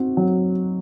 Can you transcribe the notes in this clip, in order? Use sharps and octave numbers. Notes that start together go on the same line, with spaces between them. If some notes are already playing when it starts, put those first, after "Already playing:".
Already playing: C4 D#4 F#4
F#3